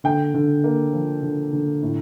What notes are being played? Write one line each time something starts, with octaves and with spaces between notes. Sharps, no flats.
D3 G5
D3
A#3
F3
D3
D3
A2